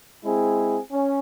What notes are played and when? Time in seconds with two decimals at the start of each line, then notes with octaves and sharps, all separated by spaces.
0.24 G#3 C4 E4 G#4
0.91 C#4